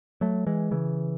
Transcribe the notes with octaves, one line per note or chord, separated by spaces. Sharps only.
F#3 A3
E3 G#3
C#3 E3